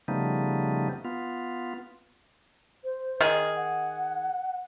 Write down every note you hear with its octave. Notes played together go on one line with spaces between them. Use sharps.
C#3 F3 G3 A3 B3 D#4
B3 F4
C5
D#3 G#4 D#5
F#5